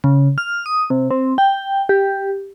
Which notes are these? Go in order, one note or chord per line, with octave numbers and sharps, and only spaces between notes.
C#3
F6
D#6
C3
C4
G5
G4